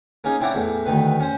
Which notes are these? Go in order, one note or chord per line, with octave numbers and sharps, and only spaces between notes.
A#3 C#4 D#4 G#4
C4 E4 C#5 D5 F#5 A#5
E2 A2
D2 D#3 B4
C#4 C5